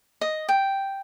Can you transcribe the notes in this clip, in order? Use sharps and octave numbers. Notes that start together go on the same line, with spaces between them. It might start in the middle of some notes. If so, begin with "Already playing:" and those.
D#5
G5